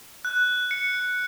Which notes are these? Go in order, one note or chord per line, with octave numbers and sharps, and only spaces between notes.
F#6
C#7